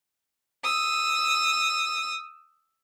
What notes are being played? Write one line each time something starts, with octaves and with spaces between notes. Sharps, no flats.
D#6 E6